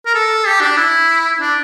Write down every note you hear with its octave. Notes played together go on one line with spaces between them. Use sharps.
A#4
A4
G4
D4
E4
D4